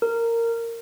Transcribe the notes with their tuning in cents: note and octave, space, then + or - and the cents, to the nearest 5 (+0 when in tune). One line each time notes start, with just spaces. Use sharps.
A#4 -15